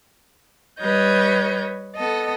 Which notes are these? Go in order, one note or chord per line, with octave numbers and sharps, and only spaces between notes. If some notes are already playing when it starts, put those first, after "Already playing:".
G3 B4 C#5 D#5 G6
B3 A4 D#5